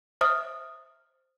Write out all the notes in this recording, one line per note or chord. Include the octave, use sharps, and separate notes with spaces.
C5 E5 D#6 F6